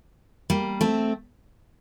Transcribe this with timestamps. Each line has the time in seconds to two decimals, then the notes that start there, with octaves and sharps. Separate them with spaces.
0.50 G3 A#3
0.81 A3 C4